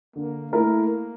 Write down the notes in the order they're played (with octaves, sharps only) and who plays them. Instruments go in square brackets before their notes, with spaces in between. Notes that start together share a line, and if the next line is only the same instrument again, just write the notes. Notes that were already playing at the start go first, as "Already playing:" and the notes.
[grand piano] D3 [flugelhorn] A#3
[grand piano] A3 E4 A#4 [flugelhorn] A#3